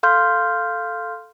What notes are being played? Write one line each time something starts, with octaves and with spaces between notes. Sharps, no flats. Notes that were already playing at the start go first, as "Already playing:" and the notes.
A4 F5 C6 F6 G6